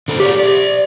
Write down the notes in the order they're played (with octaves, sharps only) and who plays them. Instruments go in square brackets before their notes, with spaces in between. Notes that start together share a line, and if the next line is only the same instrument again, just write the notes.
[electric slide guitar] D3 A4 C5
[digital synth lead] G4 [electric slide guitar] G#4 C#5 D5
[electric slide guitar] C5 D5